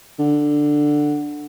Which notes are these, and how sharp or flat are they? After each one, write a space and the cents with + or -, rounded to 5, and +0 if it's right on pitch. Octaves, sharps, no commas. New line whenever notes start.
D3 +10